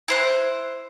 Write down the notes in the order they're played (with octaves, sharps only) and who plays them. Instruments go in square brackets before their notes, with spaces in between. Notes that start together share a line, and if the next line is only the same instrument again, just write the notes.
[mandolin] E4 C5 F#6